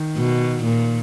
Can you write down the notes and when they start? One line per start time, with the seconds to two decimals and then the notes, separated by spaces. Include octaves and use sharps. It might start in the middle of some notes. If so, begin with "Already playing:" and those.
Already playing: D#3
0.17 B2
0.64 A#2